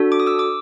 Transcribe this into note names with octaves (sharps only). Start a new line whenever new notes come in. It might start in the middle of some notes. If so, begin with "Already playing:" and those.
Already playing: D4 F#4 A4
D6
D#6
D6 E6
D6